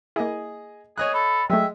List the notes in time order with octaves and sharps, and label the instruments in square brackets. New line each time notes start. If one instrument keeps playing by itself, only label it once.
[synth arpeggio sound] A#3 E4 [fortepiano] G#4 D#5
[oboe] G#4 [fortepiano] C#5 D#5 F#6
[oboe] A4 [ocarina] B5
[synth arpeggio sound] F#3 A3 [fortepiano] G#3 [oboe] E5 [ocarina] G5